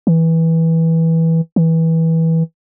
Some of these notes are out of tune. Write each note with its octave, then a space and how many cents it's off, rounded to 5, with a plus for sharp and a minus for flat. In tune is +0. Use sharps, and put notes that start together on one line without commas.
E3 -15
E3 -20